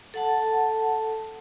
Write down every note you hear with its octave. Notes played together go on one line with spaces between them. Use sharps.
A4 F#5 A5